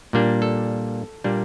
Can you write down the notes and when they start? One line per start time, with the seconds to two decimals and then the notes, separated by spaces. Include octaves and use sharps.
0.13 A#2 G3 A#3 D4
0.42 A4
1.24 A#2 G3 A#3 D4